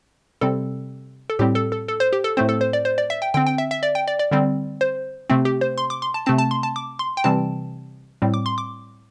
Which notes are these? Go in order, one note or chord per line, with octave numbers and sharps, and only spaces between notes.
C3 G3 C4 A4
A4
A2 G3 C4 G4
A4
A4
A4
C5
G4
A4
A2 A3 C4 C5
A4
C5
D5
C5
D5
E5
G5
D3 C4 G5
G5
E5
E5
D5
G5
D5
D5
D3 G3 C4
C5
C3 A3 C4
G4
C5
C6
D6
C6
A5
C3 A3 C4 A5
A5
C6
A5
D6
C6
G5
C3 E3 G3 C4 A5
A2 G3 C4
D6
C6
D6